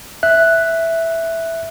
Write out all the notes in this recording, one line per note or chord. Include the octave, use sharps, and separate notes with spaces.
E5 F#6